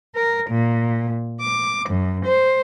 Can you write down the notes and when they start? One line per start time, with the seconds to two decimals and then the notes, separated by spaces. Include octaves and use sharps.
0.15 A#4
0.49 A#2
1.40 D6
1.88 F#2
2.24 C5